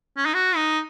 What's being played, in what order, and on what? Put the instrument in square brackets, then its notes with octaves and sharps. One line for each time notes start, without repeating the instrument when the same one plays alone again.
[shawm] C#4
D#4
F#4
D#4